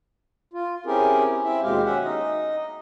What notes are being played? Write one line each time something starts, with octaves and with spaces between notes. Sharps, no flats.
F4
C4 C#4 E4 G4 G#4 A#4
C4 E4 E5
D#2 B2 G#3 G4 F5
C#4 E5 F#5
D#4 D#5